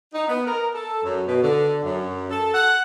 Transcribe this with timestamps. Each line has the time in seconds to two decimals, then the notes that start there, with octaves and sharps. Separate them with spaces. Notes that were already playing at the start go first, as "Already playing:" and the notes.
0.14 D#4
0.28 B3
0.46 A#4
0.73 A4
1.03 F#2
1.27 B2
1.42 D3
1.84 F#2
2.31 A4
2.54 F#5